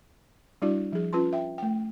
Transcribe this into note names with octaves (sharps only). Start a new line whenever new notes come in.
G3 D4 E4 F#4 D5
F3 G#4
C#4 F4 B4 A5 C6
E5 G5
A3 G5